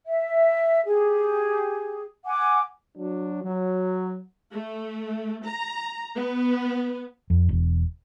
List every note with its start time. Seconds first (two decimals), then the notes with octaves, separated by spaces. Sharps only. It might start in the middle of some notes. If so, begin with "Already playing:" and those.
0.07 E5
0.86 G4 G#4
2.26 F#5 G#5 D6
2.96 F#3 D4
3.42 F#3
4.51 A3
5.46 A#5
6.15 B3
7.30 F2
7.49 E1